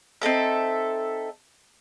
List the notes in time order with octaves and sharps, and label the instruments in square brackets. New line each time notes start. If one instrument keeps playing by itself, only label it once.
[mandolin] C4 D#4 A4 E5